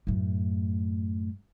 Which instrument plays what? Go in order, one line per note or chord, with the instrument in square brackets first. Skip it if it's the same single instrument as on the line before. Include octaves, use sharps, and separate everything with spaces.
[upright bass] F#2 A2